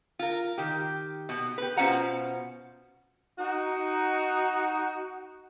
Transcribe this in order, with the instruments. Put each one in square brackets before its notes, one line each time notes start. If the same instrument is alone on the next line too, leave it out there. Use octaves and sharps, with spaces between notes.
[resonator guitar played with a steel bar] F4 A#4
D#3 G4
B2 B3
G4 B4
B2 C#4 F4 C5 F#5 A#5
[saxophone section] D#4 F#4